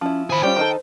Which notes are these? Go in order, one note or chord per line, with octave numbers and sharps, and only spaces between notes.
F3 C#4 E4
G#4 C5 B5
G3 C#4 F4 G5
D#3 D#4 A4